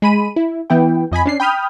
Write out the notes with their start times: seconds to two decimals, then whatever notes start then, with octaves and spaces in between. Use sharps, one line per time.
0.02 G#3 B5 D#7
0.36 E4
0.70 E3 B3 E4 G5
1.11 F2 D#5 G#5 B5
1.25 C#4 D4 C7
1.40 G5 B5 D#6 F6 G6